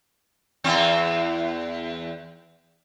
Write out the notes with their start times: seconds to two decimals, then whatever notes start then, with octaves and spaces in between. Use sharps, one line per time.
0.64 E2 C4